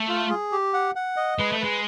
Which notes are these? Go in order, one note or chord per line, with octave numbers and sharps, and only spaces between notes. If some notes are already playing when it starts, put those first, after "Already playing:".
Already playing: A3
F4
G#4
G4
F#5
F#5
D#5
G#3 B4
A3
G#3 B4